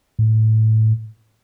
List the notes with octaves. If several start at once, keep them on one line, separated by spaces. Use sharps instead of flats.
A2